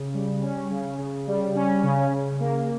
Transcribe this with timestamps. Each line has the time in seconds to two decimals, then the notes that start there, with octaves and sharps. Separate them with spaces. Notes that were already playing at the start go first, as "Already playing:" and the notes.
Already playing: C#3
0.14 G3
0.42 C#4
0.70 C#3
0.98 C#3
1.27 G3
1.55 C#4
1.83 C#3
2.11 C#3
2.40 A#3